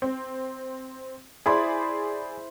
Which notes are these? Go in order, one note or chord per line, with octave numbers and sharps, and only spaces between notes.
C4
E4 G#4 C5 D5 B5